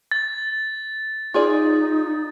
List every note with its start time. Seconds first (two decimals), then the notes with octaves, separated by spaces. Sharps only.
0.11 A6
1.34 D#4 F4 G#4 D5